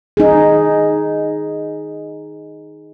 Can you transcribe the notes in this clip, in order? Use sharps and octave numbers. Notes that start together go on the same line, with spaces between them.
D#4 G#4